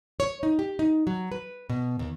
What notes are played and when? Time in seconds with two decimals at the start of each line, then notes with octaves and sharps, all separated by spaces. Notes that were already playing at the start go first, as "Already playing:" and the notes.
0.20 C#5
0.43 D#4
0.59 G4
0.79 D#4
1.07 F#3
1.32 B4
1.70 B2
1.99 D#2